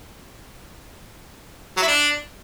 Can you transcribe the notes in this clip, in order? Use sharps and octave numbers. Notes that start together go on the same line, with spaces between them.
F#3
E4
D4